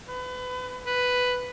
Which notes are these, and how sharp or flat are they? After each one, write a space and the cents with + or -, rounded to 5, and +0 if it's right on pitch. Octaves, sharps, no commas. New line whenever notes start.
B4 +30
B4 +5